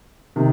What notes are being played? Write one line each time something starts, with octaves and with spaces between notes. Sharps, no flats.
C3 D#3